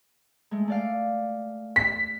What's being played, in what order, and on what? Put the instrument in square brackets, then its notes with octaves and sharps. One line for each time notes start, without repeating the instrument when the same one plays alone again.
[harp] G#3 A3
A3 D5 F5
[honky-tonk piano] B6